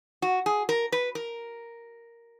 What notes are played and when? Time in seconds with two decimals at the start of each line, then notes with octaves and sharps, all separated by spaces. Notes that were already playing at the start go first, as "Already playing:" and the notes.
0.22 F#4
0.46 G#4
0.69 A#4
0.92 B4
1.15 A#4